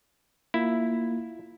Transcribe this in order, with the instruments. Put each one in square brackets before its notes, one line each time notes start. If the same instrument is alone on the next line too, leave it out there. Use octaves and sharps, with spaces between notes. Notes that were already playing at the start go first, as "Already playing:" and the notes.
[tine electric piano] A#3 F4 [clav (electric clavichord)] E4